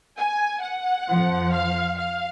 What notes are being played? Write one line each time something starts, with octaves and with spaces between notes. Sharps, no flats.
G#5
F#5
F2 F3
F5
F5